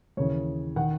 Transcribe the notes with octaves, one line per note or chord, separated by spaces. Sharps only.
D#2 C#3 E3 C#5
D#3 F#5